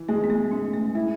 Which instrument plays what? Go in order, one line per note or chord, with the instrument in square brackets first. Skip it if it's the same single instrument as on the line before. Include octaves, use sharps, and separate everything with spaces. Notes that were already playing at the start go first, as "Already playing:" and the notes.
Already playing: [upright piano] E3
[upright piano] G#3 [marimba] A3
[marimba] B3
A3
[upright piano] G#3 [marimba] C#4
[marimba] A3
[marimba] A3 [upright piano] E4